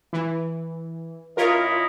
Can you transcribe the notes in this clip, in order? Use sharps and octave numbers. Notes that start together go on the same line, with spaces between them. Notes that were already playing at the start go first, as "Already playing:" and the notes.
E3
F#2 E4 F4 A#4 C#5 D#5